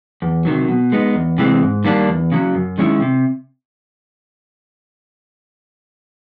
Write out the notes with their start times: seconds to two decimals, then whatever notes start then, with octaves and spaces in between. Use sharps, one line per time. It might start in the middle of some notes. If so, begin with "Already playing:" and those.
0.22 E2
0.45 C3 D#3 F#3
0.68 B2
0.92 G#3 B3 D#4
1.15 E2
1.38 C3 E3 G#3 C4
1.62 G#2
1.84 D#3 G3 A#3 D4
2.09 E2
2.32 C#3 F#3
2.54 F#2
2.78 D#3 G#3 C#4 E4
3.01 C3